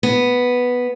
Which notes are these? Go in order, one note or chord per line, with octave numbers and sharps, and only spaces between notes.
B3